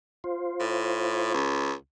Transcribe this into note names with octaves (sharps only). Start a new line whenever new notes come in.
F4 C5
A2
C#2